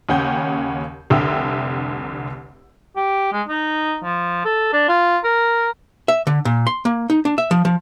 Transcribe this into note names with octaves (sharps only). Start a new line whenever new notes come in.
D#2 C#3 C#4 F#5 G5 G6
F1 C2 D3 E5 G5 E6
G4
G#3
D#4
F3
A4
D4
F4
A#4
E5
D3
A#2
C6
A#3
D#4
D4
E5
F3
F3